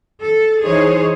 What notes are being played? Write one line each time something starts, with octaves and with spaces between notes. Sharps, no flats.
A4
E3 D#4 G#4 C5 C#5